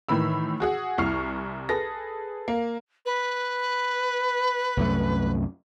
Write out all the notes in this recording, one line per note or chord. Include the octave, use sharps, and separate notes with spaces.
A2 D#3 E3 B5 E6
F#4 G#4 F#5
C2 E4 C#6 F6 C7
G#4 A4 B4 A#6
A#3
B4
C2 F#2 A3